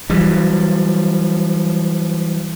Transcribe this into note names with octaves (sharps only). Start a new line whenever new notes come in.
E3 F#3 G3